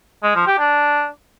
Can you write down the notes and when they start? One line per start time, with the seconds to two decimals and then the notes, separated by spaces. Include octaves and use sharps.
0.23 G#3
0.35 F3
0.47 G4
0.59 D4